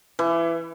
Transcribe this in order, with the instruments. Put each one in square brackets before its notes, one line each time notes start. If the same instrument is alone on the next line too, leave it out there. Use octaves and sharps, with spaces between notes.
[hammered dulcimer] E3